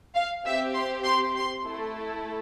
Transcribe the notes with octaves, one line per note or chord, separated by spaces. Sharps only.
F5
C4 G4 E5
C6
C6
C6
A3 E4 A4